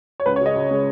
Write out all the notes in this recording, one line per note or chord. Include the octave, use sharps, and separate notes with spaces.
C#5
C#2 B4
C#5
C#3 G#3 D#5
C#2
C#3 G#3